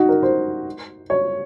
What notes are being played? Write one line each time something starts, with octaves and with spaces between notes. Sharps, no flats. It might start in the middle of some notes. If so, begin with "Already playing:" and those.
Already playing: D#4 F#4
A#4
C5
C#5